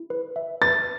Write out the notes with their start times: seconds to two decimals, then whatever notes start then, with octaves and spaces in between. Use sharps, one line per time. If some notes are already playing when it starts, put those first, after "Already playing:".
Already playing: E4
0.10 B4
0.36 E5
0.62 B4 A6